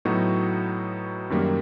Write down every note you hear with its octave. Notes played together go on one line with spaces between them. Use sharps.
A2 F#3 B3 D#4 F#4
F#2 D#3 G3 A#3